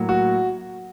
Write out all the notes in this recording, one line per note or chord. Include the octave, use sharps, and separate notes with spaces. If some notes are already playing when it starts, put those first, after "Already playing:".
Already playing: A2 F#3 A#3
F#4